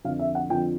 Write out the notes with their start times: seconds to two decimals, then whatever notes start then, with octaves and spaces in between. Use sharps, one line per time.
0.04 F2 D3 F3 F5
0.19 E5
0.35 F#5
0.50 F2 D3 F3 G5